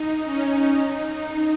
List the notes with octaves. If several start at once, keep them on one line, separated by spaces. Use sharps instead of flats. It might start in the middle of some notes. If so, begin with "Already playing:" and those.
Already playing: D#4
C#4
D#4
D#4